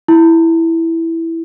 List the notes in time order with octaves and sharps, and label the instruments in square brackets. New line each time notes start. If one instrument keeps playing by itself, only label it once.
[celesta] E4